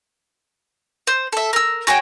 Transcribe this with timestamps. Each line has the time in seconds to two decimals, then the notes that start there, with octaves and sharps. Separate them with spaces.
1.07 C5
1.32 A4 E5
1.53 A#4 E6
1.87 F#4 G#4 C#5 G5